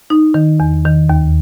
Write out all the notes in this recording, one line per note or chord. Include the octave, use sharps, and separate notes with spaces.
D#4
D#3
E2
D#3
D#2